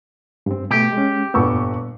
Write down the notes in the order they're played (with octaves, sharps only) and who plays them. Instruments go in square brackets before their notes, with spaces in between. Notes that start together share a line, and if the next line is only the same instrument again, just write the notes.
[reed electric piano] G2 C4
[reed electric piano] B2 A3 [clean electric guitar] G4
[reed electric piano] G#3 C#4
[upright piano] G1 C#6 E6 [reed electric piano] A#2 B3